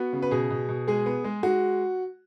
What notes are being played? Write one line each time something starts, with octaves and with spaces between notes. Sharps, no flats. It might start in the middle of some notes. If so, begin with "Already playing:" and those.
Already playing: B3 F#4
C#3
B4
B2 G#4
B2
B2
G#3 G#4
B3
G#3
G#3 F#4